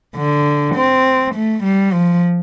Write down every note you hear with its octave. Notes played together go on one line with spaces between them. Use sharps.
D3
C4
A3
G3
F3